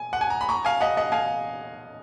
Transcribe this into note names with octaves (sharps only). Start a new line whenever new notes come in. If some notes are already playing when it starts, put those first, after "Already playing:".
Already playing: G#5
F#5
G#5
A#5
B5
A#5 C#6
F5 G#5
D#5 F#5
D#5 F#5
F5 G#5